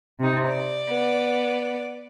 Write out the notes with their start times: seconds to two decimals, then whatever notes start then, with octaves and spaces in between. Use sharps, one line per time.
0.19 C3 D#4
0.48 D5
0.88 B3